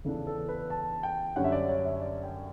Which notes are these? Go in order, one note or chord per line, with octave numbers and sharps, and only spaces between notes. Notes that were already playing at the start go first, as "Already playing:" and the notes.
E2 C#3 E3 B3 D4 A4
A4
B4
A5
G5
F#2 D3 G3 C#4 F#5
E5
D5
C#5
E5
D5
G5